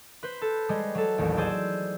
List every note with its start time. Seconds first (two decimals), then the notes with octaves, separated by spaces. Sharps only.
0.23 B4 C5
0.42 A4
0.69 G3 G#3
0.95 F#3 A4
1.18 A1 D#2
1.37 G#4 C5 D5 E6